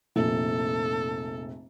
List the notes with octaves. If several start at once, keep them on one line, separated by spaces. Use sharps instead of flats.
F1 A#1 A4